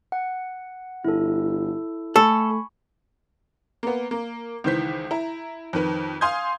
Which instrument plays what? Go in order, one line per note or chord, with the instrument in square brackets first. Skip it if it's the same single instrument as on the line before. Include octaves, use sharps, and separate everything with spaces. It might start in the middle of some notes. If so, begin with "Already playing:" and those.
[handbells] F#5
[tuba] G1 [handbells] E4 A4
[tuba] A3 [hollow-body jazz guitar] A4 [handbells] G#5 B5 C#6
[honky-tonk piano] A#3 B3
A#3
C#2 D#3 E3 C5 G6 B6
E4 A#5
F2 D#3 B4
F5 G#5 C6 D#6 G6 G#6